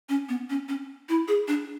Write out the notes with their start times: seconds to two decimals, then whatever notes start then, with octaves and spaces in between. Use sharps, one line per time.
0.09 C#4
0.29 B3
0.50 C#4
0.69 C#4
1.09 E4
1.28 G#4
1.48 D4